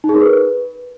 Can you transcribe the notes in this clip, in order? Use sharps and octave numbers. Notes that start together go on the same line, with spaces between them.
D#4
G#4
A#4
B4